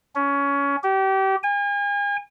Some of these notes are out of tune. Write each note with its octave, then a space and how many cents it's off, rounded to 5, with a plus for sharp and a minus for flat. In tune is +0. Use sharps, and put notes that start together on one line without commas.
C#4 +20
G4 -30
G#5 -40